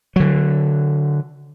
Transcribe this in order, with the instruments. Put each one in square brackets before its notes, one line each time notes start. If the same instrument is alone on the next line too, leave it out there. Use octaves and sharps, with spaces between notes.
[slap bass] D3 F#3